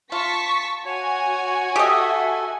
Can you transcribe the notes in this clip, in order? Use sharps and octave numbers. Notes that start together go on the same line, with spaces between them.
F4 A5 C#6 B6
F#4 C#5 G#5
G4 A4 D#5 E5